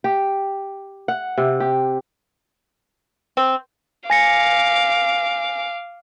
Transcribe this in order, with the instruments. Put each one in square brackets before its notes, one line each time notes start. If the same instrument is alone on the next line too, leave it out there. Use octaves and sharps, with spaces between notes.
[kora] G4
F#5
C3
G4
[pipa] C4
[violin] F5 D6 [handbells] G#5 A#6 C#7